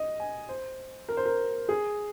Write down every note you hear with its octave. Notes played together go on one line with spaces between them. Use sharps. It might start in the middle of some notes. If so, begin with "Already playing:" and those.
Already playing: D#5
G#5
C5
A#4
C5
A#4
G#4